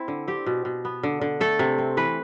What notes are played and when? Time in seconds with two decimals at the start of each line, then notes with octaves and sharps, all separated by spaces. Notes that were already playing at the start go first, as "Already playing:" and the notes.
Already playing: C4 E4
0.08 D3
0.28 C4 G4
0.46 B2
0.65 B2
0.85 B3
1.03 D3
1.21 D3
1.40 A3 A4
1.59 C3
1.78 C4
1.97 E3 B4